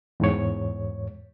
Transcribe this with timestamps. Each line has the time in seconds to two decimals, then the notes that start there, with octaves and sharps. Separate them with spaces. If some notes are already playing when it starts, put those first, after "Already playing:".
0.20 E2 G#2 C#5